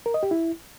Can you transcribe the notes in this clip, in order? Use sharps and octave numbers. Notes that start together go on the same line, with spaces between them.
A#4
D#5
G4
E4